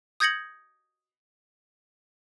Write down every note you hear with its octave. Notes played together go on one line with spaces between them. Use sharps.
D#6 G6 G#6 A#6 C#7 F#7